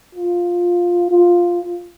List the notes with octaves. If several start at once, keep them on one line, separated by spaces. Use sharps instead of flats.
F4
F4